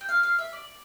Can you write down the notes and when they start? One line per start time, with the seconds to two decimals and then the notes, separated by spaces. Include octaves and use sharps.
0.01 G5
0.09 F5
0.23 F5
0.39 E5
0.53 D5